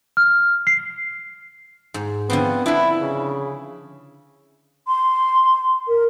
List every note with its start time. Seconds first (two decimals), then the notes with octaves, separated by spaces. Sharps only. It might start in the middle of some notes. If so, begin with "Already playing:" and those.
0.17 F6
0.67 C7
1.94 G#2
2.30 D3 F3 B3 C4
2.66 D4 E4 B4
3.01 C#3
4.88 C6
5.88 A#4